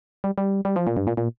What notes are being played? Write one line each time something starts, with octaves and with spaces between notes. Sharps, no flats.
G3
G3
G3
F3
A#2
G2
A#2
A#2